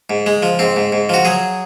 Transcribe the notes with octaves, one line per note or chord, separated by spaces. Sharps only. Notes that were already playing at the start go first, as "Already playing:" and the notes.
G#2
G#3
F3
G#2 C4
G#2
G#2
F3 F#4
F#3 G#4